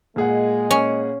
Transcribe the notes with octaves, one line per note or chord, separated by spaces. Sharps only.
A#2 G#3 G#4 F#5
C#4